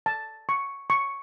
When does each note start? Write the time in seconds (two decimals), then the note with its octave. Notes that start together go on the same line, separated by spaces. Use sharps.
0.06 A5
0.49 C#6
0.90 C#6